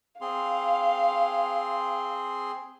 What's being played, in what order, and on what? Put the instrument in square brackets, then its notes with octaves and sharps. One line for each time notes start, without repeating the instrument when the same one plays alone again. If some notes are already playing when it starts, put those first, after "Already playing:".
[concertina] C4 G#4 C6 [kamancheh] F5